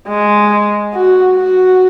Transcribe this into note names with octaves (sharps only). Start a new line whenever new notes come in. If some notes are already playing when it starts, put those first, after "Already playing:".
G#3
F#4
F#4